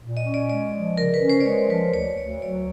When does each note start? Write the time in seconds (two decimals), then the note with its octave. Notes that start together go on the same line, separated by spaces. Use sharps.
0.02 A#2
0.17 D#5
0.25 C#4
0.34 D5
0.49 G#3 D5
0.73 F3
0.97 C#3 A#4
1.14 B4
1.21 C#4
1.30 C5
1.41 D5
1.46 G#3 C#5
1.70 F3 B4
1.94 D2 C#5
2.17 D2 D5
2.42 F#3 D5